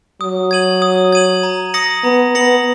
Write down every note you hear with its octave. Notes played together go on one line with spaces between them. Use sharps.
F#3 D#6
G#6 D#7 F#7
D#6
G#6 D#7 F#7
A#5
D#6 A#6 C#7 F#7
B3 A#5
B3 D#6 A#6 C#7 F#7